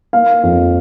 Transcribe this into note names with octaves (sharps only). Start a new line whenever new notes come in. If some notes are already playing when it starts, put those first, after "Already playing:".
A#3 F5
F2